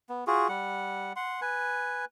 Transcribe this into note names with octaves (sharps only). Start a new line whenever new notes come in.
B3
F4 F#4 G#4
G3 F#5
F#5 C6
B4 G#5